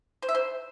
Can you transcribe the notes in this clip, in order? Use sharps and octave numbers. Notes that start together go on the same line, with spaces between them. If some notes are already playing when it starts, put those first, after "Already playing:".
C5
E5
C5